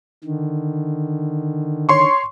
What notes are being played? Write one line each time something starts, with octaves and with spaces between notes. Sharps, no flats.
D3 D#3
C#5 C6 C#6